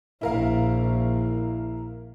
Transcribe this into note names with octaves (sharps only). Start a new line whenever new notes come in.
A#1 E4 A#4 F5